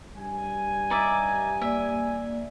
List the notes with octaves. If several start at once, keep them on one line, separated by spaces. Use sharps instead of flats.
G2 G3 G#5
D#4 D5 E5
A#3 D5 E5